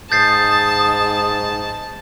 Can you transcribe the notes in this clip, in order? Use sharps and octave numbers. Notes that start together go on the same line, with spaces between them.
G#2 A5 D#6 G6 A6 C7